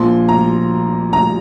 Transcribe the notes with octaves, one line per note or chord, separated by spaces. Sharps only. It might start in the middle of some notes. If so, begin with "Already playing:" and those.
Already playing: A#1 A#2 F3 C6
A#5
A#5